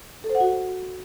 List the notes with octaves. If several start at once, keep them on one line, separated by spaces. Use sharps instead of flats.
A4
C5
F#5
F#4